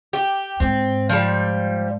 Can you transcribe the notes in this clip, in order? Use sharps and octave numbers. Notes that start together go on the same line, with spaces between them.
G4
G#2 C4
F3 G3